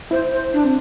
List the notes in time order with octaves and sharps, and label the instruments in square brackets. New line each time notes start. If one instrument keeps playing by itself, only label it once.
[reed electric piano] E4 [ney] C5
[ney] C5
D4
[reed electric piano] C4